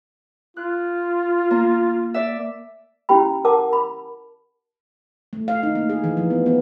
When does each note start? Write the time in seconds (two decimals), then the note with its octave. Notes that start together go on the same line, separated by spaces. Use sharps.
0.57 F4 F#6
1.51 A#3
2.14 D5 E5
3.09 C#4 E4 G4 G5 B5
3.45 A#4 F#5 A5 D6
3.73 B5
5.33 A3
5.48 F5
5.63 D#4
5.75 A#3
5.89 G#4
6.04 E3
6.17 F3
6.30 B3
6.46 B3